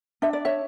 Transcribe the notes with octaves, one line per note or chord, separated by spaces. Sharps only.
D4 E5
D5
C#5 E5